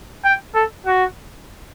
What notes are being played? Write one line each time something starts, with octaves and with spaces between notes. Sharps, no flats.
G5
A4
F#4